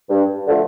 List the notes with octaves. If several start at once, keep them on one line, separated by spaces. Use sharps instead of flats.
G2
D3 F3 A3